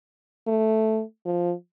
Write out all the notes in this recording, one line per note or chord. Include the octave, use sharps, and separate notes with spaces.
A3
F3